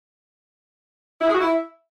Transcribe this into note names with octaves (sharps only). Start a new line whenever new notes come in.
E4
G#4
F#4
E4